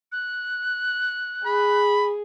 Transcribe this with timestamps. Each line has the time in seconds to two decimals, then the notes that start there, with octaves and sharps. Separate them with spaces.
0.12 F#6
1.46 G#4 B5